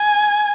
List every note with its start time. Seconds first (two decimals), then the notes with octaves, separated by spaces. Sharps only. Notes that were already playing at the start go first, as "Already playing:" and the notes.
Already playing: G#5